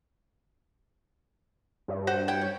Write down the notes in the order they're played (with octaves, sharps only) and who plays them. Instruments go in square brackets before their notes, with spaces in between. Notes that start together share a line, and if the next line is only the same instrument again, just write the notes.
[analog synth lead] G2
[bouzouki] A3 C5 [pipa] F#4
[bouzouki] E4 G4 F#5 [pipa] G5
[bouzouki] C#4